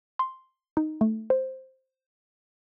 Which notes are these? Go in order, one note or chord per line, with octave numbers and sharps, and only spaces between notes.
C6
D#4
A3
C5